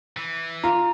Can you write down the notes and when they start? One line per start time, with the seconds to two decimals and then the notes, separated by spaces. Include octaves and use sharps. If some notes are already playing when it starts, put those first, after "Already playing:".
0.17 E3
0.64 F4 A#5